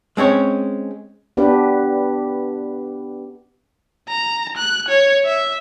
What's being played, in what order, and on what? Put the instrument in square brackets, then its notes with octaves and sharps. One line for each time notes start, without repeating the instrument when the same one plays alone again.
[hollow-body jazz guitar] G#3 C4 C#4 C#5
[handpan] B3 D4 G4 B4
[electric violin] A#5
F#6
C#5
E5